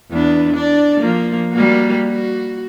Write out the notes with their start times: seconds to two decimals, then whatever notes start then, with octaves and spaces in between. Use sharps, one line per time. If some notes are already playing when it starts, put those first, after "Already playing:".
0.11 E2 B3 D4
0.54 D4 D5
1.00 F3 A#3
1.53 G3 A#3 F#4
2.08 F#4